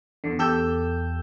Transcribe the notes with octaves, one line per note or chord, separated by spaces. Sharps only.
E2 D3
E2 G4 A4 E6 G6